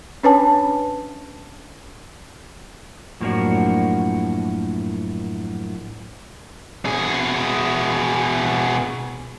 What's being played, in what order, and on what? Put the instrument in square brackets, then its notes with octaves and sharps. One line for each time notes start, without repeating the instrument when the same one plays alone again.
[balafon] C#4 D4 B4 C#5 G#5 A5
[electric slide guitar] F#2 A2 F3 A#3 D4 F#4
[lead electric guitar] B2 G#4